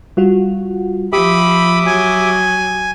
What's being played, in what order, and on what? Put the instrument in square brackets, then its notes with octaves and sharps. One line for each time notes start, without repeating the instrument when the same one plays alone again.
[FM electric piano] G3 F4 F#4
[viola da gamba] F3 [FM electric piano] G4 [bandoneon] E5 D6 D#6 [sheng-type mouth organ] B5
[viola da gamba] F#3 [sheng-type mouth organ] G#5